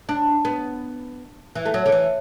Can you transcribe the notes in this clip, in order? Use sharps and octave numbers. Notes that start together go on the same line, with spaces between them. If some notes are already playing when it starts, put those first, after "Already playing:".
D4
B3
E3
A3
F#3
D3
E3